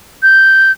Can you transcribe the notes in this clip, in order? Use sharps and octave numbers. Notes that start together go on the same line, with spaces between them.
G6